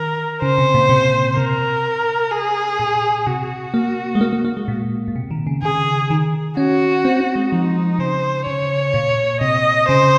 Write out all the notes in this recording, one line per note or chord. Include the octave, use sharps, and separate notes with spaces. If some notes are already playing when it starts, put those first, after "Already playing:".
Already playing: D#3 A#4
C#3 C5
C3
A#2
C3
C3 A#4
G#4
A#2
C3 F#4
A#3
G#3
A#3
A#3
A#3
G#3
A#2
A#2
C3
D#3
C#3
C#3 G#4
D#3
C#4 F#4
C4
C4
G#3
F3 D#4
C#3 C5
C#3 C#5
A#2
C3 D#5
C#3 C5